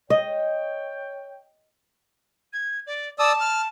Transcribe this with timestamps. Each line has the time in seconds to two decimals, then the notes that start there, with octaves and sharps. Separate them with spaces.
0.10 C#5 D#5 G5
2.53 G#6
2.87 D5
3.19 D5 A5 D#6 E6
3.41 F6